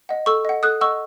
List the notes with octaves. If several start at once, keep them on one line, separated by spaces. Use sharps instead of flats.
D#5 F#5
A4 C#6 E6
D#5 F#5
A4 D#6 F#6
D#5 F#5 C#6 E6